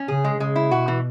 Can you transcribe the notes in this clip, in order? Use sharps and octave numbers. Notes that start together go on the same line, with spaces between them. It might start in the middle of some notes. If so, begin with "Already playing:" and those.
Already playing: C#4
C#3 G#4
G#3
C#3 G#3
E4
B2 F#4
E3